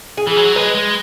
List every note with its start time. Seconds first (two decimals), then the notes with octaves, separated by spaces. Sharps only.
0.17 G#4
0.27 E3
0.37 F#3
0.56 G#3 B4
0.75 G#3